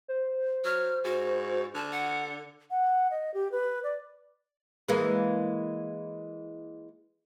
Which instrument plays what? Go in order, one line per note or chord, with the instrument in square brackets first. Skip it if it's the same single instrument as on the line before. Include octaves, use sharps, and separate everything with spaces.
[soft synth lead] C5
[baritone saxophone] F#3 [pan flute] F6
[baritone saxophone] G#2 [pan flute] F#4
[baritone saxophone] D3 [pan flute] A5
[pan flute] F#5
[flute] F#5
D#5
G4
B4
D5
[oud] E3 G#3 A#3